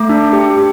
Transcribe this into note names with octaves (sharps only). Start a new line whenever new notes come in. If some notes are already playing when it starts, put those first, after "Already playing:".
Already playing: A3 D6
D4
G4
G4